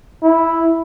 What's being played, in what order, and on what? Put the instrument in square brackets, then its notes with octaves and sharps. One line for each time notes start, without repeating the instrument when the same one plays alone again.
[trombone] E4